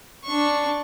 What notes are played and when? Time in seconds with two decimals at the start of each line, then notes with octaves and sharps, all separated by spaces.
0.25 D4 C#6